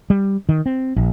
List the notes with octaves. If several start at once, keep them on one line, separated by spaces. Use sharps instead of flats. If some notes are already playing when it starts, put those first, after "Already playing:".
G3
D#3
C4
A#1